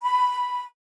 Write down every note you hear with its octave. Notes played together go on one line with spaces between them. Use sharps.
B5